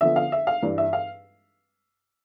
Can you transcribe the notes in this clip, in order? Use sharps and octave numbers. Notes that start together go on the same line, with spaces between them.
D3 F3 B3 E5
F5
E5
F5
G2 E3 G3 D4
E5
F5